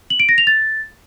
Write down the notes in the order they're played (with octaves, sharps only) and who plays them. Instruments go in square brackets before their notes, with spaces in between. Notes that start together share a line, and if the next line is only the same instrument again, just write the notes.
[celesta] F#7
D7
A#6
F7
A6